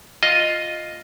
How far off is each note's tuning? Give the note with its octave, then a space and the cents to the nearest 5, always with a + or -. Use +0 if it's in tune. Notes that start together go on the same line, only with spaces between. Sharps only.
F4 +0 D#5 +0